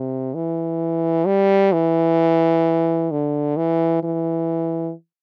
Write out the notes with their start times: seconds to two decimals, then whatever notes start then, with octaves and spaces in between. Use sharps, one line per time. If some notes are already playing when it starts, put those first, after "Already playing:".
Already playing: C3
0.34 E3
1.26 G3
1.73 E3
3.12 D3
3.57 E3
4.03 E3